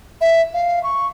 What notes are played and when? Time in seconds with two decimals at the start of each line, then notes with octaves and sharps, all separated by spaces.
0.21 E5
0.54 F5
0.84 C#6